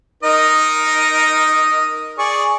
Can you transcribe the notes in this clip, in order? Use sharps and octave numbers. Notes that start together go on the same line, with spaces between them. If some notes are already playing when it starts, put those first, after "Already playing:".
D#4 A#4 D#5
G#4 D5 C#6